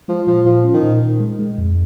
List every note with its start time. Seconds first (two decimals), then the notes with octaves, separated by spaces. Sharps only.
0.08 F3 G#3
0.27 A#2 F3
0.45 A#2 F3
0.64 C#4
0.74 D#3
0.83 A#2
1.02 A#2
1.20 G#3
1.39 G#3
1.58 F2